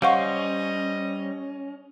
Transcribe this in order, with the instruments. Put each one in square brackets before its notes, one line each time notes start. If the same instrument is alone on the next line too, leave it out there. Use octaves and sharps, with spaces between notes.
[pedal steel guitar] G3 C5 C6 [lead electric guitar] C#4 [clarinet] D#5 [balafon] F5 F#5 C#6